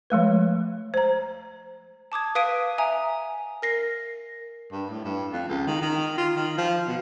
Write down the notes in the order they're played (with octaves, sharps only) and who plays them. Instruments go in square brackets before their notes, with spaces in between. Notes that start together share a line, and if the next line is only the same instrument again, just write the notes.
[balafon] F3 G#3 A3 B4
C5 A#5
[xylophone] A5 D6 D#6 G#6
B4 F5 D#6 B6 D7 D#7
E5 G#5 A#5 D#6
A#4 A#6 C7
[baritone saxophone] G2
A2
G2
F2
C#2
D#3
D#3
F4
D#3
F3
B2